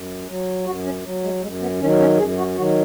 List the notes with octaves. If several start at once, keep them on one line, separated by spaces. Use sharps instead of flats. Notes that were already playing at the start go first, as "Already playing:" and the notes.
Already playing: F#2
F#3
F#2 F#4
C#4
F#3
G#3
F#2 G#3
B3
D#3 F#3 C#4
C#4
F#2 G#4
F#4
D#3 F#3 F#4